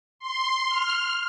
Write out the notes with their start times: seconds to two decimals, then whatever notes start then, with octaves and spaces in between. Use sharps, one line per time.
0.19 C6
0.69 F6